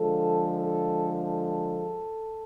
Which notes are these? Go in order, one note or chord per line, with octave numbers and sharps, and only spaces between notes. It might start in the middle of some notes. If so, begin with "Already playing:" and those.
Already playing: D3 F3 G#3 A4
A4
A4